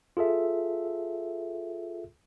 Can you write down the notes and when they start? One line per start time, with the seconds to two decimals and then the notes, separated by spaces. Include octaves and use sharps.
0.17 F4 G#4 A4 E5